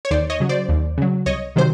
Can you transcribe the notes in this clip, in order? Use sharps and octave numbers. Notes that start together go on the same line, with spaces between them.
C#5
D#2 C5 D5
C#5 D#5
C#3 F#3
C5 D5
D#2
C#3 F#3
C2 C#5 D#5
C3 D#3 F#3 C5